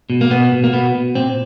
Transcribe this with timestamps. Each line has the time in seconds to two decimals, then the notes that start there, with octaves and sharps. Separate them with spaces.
0.10 B2
0.21 A#3
0.30 B2 B3
0.52 B2
0.64 A#3
0.73 B2 B3
0.94 B2
1.15 A#2 C4